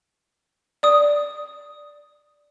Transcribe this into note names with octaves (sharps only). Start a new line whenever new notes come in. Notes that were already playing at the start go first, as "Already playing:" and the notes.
D5 D#6